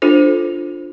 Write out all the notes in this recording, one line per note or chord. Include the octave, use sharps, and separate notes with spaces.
D4 F4 A4 C5